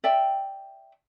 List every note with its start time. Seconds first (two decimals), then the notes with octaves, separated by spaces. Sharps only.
0.04 D5 E5 G5